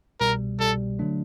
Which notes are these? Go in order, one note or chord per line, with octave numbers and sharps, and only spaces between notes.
C2 B2 G3 A#4
C2 B2 G3 A4
D3 F#3 A3 D4